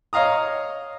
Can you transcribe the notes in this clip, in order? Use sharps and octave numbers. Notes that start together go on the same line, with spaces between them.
C#5 D#5 F5 A#5 D#6